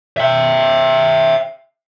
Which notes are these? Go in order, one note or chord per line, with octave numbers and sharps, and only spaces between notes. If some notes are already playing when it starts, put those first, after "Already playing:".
E5 G5